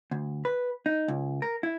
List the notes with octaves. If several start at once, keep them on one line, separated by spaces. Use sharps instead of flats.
D2
B4
D#4
C#2
A#4
E4